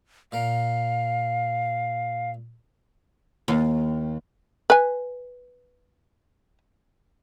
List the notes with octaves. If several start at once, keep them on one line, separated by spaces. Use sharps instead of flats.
A#2 A#4 F5
D#2
B4 G#5